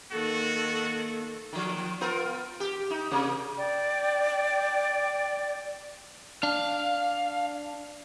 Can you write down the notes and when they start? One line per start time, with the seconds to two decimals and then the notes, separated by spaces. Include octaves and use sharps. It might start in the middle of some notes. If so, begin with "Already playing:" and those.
0.11 D#3 A#3 F#4 A4
1.53 D#3 F3
2.01 B3 F4 A#4
2.60 G4
2.90 D#4
3.11 C3 A#3
3.57 D5 G5
6.43 D4 F5